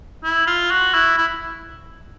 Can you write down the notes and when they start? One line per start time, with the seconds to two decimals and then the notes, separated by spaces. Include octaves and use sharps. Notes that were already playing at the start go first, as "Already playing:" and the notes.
0.24 E4
0.47 F4
0.70 F#4
0.94 E4
1.18 E4